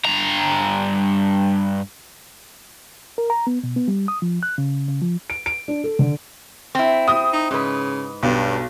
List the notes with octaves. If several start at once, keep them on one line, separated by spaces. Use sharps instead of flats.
G2 A#5
A#4
A#5
B3
B2
B3
G3
D#6
F3
F#6
C#3
C#3
F3
D7
D7
D4
A4
D3
C4 E4
D#6
D#4
G#2 C#3 B4
B1 G2